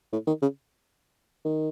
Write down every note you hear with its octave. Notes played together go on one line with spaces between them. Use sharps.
A2
D#3
C#3
D#3